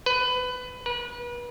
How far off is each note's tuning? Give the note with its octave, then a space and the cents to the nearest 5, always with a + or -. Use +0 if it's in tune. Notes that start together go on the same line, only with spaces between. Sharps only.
B4 +20
B4 -35